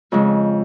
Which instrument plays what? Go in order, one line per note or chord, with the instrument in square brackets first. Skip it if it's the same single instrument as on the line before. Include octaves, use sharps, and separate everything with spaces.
[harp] F2 C#3 G#3